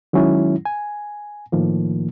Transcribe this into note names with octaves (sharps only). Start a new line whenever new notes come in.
D#3 F#3 G#3 C#4 E4
G#5
A2 D#3 F3 A#3